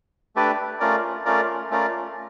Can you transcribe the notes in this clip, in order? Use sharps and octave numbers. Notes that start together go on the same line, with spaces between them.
A3 D4 G4 B4 D5
A3 C#4 F4 A#4 D5
A3 C#4 F4 A#4 D5
A3 C#4 F4 A#4 D5